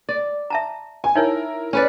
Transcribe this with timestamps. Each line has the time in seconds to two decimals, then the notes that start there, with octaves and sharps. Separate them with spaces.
0.09 D5
0.50 E5 A5 A#5
1.04 G#5
1.15 D#4 E4 A#4 C#5
1.73 C#4 B4 D5